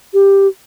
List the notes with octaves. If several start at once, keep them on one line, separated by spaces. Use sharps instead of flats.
G4